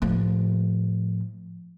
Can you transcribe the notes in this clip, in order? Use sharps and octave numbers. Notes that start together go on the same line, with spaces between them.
A2 F3